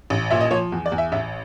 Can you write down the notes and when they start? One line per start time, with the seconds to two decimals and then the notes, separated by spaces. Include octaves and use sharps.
0.10 A1
0.31 A#2 E5
0.40 D#5
0.51 F3 C#5
0.72 E2
0.86 D5
0.92 E2
0.98 E5
1.12 A1 E5